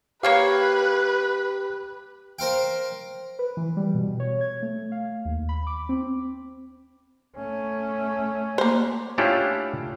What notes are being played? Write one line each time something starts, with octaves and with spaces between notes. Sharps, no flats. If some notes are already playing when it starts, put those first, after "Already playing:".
A#3 G4 B4 C#5 F5
A#4 C5 F5 G5
B4
E3
G3
B2
C#5
G#6
A3
F5
D#2
B5
D6
C4
A3 C#4
A#3 C5
A3 C#4 D4 E4 F4 G4